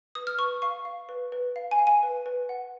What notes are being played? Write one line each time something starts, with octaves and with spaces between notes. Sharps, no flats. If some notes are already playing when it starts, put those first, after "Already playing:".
B4 D#6
F6
B4 C#6
F5 C#6
F5
B4
B4
F5
G#5
F5
G#5
B4
B4
F#5